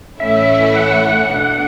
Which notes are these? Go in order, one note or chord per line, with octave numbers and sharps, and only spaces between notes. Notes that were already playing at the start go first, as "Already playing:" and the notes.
A2 E3 A3 C#4 E4 E5
F#5
B2 A3 D4